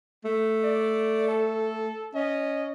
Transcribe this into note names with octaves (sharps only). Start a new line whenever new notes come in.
A3
D5
A4
C#4 D#5